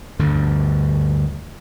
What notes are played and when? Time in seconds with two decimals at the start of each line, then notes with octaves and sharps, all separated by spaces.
0.19 D2 G2 D3